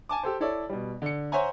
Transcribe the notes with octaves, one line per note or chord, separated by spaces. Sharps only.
G#5 A5 D6
G4 A4 C5
E4 A4 C#5 D5
B2 G3
D3 C#7
C5 C#5 E5 F#5 G#5 A#5